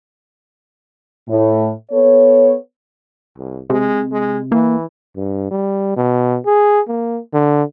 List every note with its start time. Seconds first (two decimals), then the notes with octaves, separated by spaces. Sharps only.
1.29 A2
1.91 B3 A4 C#5
3.38 C2
3.70 C3 G#3
4.12 G#3
4.52 E3 A#3
5.16 G2
5.51 G3
5.97 B2
6.46 G#4
6.88 A#3
7.33 D3